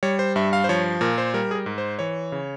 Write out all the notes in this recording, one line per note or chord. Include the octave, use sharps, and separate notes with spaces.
G3 C#5
C5
G2 E5
F5
C5
F3 C#5
A#2 A#4
C5
G3 A#4
G#4
A#4
G#2
C5
E3 C#5
C#3